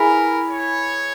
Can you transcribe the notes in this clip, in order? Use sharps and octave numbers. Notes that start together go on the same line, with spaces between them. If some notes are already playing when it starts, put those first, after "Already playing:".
Already playing: E4 G#4 A#4 B4
C#5